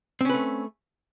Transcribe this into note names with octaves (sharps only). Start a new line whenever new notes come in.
A3 C4 C#4 B4